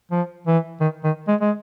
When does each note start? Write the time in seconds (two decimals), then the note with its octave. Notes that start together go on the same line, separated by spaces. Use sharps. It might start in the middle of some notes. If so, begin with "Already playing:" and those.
0.11 F3
0.47 E3
0.80 D#3
1.04 D#3
1.28 G#3
1.41 G#3